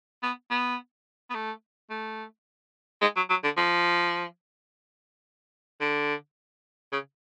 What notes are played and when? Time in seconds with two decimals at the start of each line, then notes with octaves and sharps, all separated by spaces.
0.23 B3
0.50 B3
1.30 B3
1.34 A3
1.90 A3
3.01 G#3
3.16 F#3
3.30 F#3
3.44 D3
3.57 F3
5.81 D3
6.92 C#3